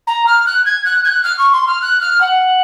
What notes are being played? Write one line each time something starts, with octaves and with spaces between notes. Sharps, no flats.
A#5
F6
F#6
G#6
F#6
G#6
F#6
F6
C#6
C6
F6
F#6
F6
F#5